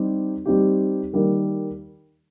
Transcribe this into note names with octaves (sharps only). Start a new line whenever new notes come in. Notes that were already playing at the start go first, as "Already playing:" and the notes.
Already playing: G3 C4 D#4 G4
G3 C4 D#4 G4
D#3 G3 A#3